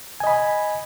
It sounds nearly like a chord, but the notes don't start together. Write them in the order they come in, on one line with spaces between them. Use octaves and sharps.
G#5 D#5 B5